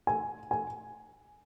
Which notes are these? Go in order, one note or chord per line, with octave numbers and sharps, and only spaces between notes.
G#5
G#5